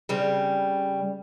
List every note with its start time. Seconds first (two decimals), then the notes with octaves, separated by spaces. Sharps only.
0.09 C#3 G3 C4